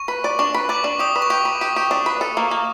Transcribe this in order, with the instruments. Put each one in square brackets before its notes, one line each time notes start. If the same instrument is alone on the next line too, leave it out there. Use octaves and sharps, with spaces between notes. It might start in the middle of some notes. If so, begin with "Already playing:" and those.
Already playing: [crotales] C#6
[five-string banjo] B4
D5
[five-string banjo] D4 [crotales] C#6
[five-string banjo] B4
[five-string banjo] D5 [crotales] D6
[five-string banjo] D4
[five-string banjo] G4 [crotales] D#6
[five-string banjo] B4
[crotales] C#6
[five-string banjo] G4 [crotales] D6
[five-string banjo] B4
G4
G4
D4
B4
A4
A#3
A#3